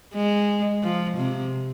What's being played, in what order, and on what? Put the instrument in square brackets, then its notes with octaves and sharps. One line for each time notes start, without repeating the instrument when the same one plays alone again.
[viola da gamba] G#3
F3
C3